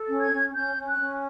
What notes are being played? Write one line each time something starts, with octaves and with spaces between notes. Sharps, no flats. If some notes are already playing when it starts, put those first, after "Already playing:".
Already playing: A4
C#4
G#6
C#4
C#4 G6
C#4
F#6
C#4